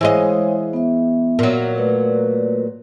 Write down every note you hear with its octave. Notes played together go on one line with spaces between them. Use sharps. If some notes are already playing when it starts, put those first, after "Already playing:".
E3 G#3 C5 C#5 D#5 F5
B3 E5
A#2 F#3
A3 B4 D5